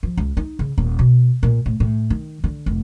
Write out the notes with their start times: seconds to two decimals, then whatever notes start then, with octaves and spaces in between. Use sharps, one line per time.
0.03 F3
0.17 C#2
0.37 D#4
0.59 C#3
0.78 D#1
0.99 B2
1.43 A#2
1.66 A2
1.80 A2
2.10 D#3
2.44 D3
2.66 F1